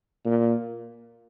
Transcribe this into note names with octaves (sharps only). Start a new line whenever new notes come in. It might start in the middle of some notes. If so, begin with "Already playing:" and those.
A#2